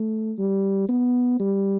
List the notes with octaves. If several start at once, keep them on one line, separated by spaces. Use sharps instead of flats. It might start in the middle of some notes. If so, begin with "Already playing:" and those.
Already playing: A3
G3
B3
G3